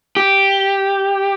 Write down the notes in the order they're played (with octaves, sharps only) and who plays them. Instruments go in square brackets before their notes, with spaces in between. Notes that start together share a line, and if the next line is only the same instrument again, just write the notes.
[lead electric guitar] G4